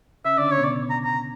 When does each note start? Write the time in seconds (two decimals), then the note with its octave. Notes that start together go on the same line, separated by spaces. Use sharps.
0.25 C#3 C#4 E5
0.36 D3 D4 D5
0.47 C#3 C#4
0.51 C#5
0.57 B2 B3
0.64 D5
0.90 A#5
1.04 A#5